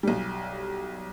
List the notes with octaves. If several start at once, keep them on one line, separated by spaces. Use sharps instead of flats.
B1 G3